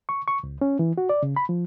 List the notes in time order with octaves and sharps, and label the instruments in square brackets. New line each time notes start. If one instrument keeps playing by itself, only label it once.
[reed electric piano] C#6
C#6
C#2
C#4
E3
F#4
D5
C#3
B5
F3